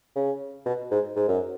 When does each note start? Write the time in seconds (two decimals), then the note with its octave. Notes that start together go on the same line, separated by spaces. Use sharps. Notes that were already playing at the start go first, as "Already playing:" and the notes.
0.15 C#3
0.66 B2
0.91 G#2
1.16 G#2
1.28 F#2